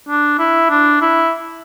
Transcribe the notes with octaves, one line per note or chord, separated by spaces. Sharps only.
D4
E4
D4
E4